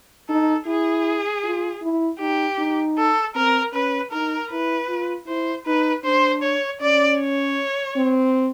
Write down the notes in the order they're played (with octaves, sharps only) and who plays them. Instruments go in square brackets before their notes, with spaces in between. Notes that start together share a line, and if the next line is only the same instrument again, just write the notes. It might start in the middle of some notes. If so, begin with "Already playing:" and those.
[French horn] D#4 [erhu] A4
[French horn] E4 [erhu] G#4
[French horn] F4
E4
[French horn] D#4 [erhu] G4
[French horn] D#4
[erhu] A4
[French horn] C4 [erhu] A#4
[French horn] C#4 [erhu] B4
[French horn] D#4 [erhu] A#4
[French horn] E4 [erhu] B4
[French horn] F4
[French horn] E4 [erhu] C5
[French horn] D#4 [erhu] B4
[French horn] D4 [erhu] C5
[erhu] C#5
[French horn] C#4 [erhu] D5
[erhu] C#5
[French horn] C4